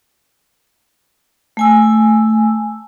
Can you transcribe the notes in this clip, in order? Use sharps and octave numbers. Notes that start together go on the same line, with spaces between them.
A3 G#5 E6